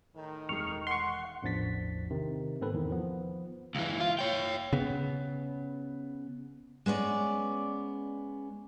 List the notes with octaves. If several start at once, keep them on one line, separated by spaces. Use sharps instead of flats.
A2 D#3
E1 G#3 C#6 F6 C7
F#5 C6 C#6
A1 E2 F3 D4 A6 B6
C3 D#3
G#2 B3 C4 A4 B4
E2 D#3 E3
F3 B3
C#2 E3
F4
C#5 G5
C#3 B3
G#3 B3 C#4 D5